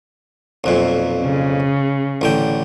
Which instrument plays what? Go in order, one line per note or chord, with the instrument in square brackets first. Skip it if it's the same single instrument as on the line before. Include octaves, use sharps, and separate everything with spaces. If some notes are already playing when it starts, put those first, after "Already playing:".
[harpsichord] B1 F2 A#2
[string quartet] C#3
[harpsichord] A1 D3 G5